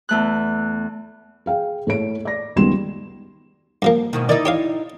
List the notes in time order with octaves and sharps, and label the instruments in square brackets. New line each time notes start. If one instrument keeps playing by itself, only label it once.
[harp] E2 A3 F#6
[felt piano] G#4 F5 G5
A2 A3 C#5 D7
D5 A#6
C#2 D#3 G3 B3 C6 E7
[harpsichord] G2 F3 A#3
[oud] G#2 B2 D#3
[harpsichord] D#3 [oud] D#4 E4 D5
[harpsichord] G4 C#5 F5